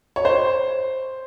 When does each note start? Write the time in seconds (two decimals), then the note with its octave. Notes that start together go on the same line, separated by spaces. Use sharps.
0.16 C#5
0.25 C5